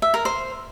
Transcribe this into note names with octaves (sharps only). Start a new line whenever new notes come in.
E5
A#4
C5